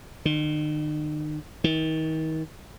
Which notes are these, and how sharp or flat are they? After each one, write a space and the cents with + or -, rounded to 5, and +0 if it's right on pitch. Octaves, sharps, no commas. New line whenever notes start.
D#3 -40
D#3 +35